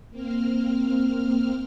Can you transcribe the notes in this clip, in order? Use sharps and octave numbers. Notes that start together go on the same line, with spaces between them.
A#3 C4 F6